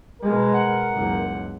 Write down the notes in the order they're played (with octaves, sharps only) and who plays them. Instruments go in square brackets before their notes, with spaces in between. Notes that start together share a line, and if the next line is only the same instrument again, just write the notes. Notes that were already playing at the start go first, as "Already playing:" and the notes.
[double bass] B2 G#3 [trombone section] A#4
[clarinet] F#5
[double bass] F#1 C#2